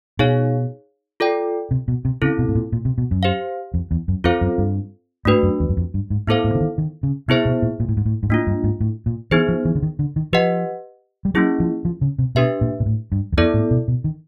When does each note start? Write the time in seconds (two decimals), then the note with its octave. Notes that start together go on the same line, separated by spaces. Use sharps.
0.19 B2 D#4 G#4 C#5 F5
1.20 F4 A4 D5 G5
1.71 C3
1.88 B2
2.05 C3
2.22 C#3 C4 E4 A4
2.39 B2
2.49 A2
2.55 A#2
2.72 A#2
2.85 C3
2.98 B2
3.11 F#2
3.23 G4 C5 F5
3.74 F2
3.91 E2
4.08 F#2
4.24 F2 C4 F4 A4 C5 F5
4.41 F#2
4.58 G2
5.25 G#2 A3 D4 F#4 B4
5.43 F#2
5.60 E2
5.69 F#2
5.77 F2
5.94 G2
6.10 G#2
6.27 A2 B3 E4 A4 C5 F5
6.44 A2
6.55 D3
6.61 D#3
6.78 D#3
7.03 C#3
7.28 C3 B3 E4 G#4 C5 E5
7.45 B2
7.62 A#2
7.80 A#2
7.89 A2
7.97 G#2
8.06 A2
8.23 G#2
8.30 A2 A#3 D4 F4
8.47 G2
8.64 G#2
8.80 A2
9.06 A#2
9.31 E3 B3 D#4 G#4 C5
9.49 F3
9.65 E3
9.75 D3
9.82 D#3
9.99 D3
10.16 D#3
10.33 F3 G4 B4 D#5 F#5
11.25 G3
11.34 F#3 A#3 C#4 E4 G#4
11.60 F3
11.85 F3
12.01 C#3
12.19 C3
12.35 B2 D4 G4 B4 E5
12.61 A#2
12.80 A#2
12.86 A2
13.12 G2
13.32 E2
13.37 F2 B3 E4 A4 D5
13.54 A2
13.71 B2
13.88 B2
14.04 D#3